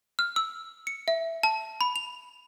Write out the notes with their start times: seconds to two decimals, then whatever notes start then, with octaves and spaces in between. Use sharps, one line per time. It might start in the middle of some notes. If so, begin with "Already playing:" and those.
0.19 F6
0.36 E6
0.87 C#7
1.08 E5
1.43 A5
1.81 B5
1.96 F7